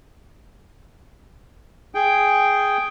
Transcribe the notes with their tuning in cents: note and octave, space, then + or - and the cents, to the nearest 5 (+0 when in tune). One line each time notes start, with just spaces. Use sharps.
G#4 +0 G5 +0